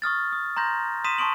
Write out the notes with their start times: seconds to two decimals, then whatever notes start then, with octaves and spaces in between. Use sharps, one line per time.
0.02 C#6 D#6 F6 A6
0.32 D#6
0.57 A#5 C6 G6 A#6
1.04 C6 D#6 B6 D#7 E7
1.18 A5 C6 C#6 D#6 D7 F#7